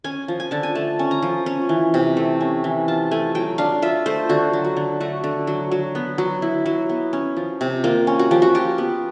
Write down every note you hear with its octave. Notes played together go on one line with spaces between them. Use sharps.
C#4 G#5
F3
G#5
D3 A5
G#5
A3 A5
C#4
A#5
F3
C#4
E3
C3
A3
C#4
E3
F4 A5
A3 G#5
F#3 G5
D4 F5
F4 E5
A3 C5
D3 F#4
F#3
F#4
D3
A3 F#4
D3
F#3
F#3
B3
F#3
E4
F#3
B3
C#4
F3
C3
A#3 F4
C#4
F#4
F3 G4
F#4
F4 G4
B3